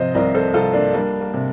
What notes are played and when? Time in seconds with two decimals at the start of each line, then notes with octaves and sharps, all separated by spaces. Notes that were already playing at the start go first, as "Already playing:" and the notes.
Already playing: C3 F3 C5 D#5
0.14 C2 A#4 D5
0.35 A4 C5
0.54 C2 F4 A4
0.73 A#3 D4
0.93 G3 A#3 D4
1.21 A#3
1.34 C3